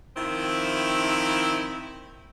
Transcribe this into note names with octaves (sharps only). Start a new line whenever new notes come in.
D#3 F3 C4 E4